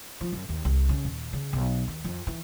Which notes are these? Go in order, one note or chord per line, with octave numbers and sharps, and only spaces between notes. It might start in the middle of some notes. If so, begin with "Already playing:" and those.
F3
F#2
D#2
C2
C#3
D#1
C#3
B1
D#2
F2
E3